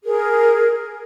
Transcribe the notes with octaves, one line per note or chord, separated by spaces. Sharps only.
G#4 A#4